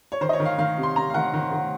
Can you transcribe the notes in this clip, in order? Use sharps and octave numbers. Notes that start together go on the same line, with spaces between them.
C#5
D#3 C5
D#5
C#5
D#3
F5
D#3 F5
C3
C6
C3 A#5
F5
D#3 F#5
D#3
D#3